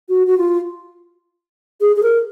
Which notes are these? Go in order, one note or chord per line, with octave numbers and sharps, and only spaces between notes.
F#4
F#4
F4
G#4
G#4
A#4